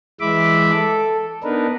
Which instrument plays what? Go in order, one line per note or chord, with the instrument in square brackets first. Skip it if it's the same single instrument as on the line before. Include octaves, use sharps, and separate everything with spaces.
[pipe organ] E3 G#3 E5 B5 D6
A4
B3 D4 D#4 A#4 B4